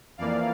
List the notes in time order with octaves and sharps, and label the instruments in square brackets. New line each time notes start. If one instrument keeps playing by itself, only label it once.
[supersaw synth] F2 E3 A#3 D5 F5